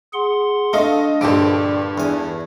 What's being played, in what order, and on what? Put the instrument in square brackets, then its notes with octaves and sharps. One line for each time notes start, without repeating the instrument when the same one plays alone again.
[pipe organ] G#4 F#5 C6
[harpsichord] A3 [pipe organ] D4 [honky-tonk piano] A4 D#5 F5
[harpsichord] A#1 D3 G4 [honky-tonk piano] G2 A4 D7
[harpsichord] E2 G#5